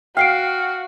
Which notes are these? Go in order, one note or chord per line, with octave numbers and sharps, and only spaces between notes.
F#4 F5 G5 C7 D7